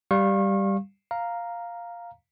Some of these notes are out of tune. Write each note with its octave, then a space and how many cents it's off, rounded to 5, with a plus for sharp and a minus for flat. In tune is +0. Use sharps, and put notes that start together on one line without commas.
G3 +0 F5 +0 C#6 -35
F5 +0 A#5 +0